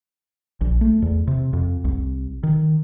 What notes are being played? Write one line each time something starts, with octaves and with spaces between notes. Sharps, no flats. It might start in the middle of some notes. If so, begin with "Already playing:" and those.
A#1
A3
E2
C3
F2
C2
D#3